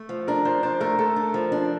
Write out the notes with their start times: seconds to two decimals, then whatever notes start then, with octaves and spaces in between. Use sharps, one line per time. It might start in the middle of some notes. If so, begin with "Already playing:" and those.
Already playing: A3
0.09 F3
0.27 D4 A#4
0.45 F3 C5
0.63 D4 C5
0.80 A3 A#4
0.99 A3 A4
1.16 D4
1.34 F3
1.52 D4